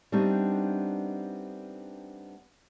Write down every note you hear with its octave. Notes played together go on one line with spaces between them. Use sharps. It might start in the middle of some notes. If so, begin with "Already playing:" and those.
G3 A3 B3 C4 D4 D#4